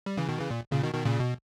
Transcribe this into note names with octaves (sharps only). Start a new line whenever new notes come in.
G3
C#3 E3
B2 D#3
C#3 E3
A#2
A#2 C#3
B2 D#3
B2 D#3
A#2 C#3
B2